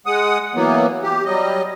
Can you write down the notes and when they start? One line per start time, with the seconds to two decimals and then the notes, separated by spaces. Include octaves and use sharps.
0.06 G#3 F#5 D#6
0.55 E3 F#3 A#3 B3
1.02 G4
1.25 F#3 G3 D#5